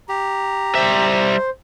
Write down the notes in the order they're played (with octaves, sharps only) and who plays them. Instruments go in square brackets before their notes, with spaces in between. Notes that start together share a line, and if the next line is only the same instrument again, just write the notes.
[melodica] G4 [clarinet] A#5
[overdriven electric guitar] G3 E5 [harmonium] C5